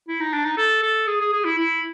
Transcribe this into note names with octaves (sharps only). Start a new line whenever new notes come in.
E4
D#4
D4
D#4
A4
A4
G#4
G#4
G#4
E4
E4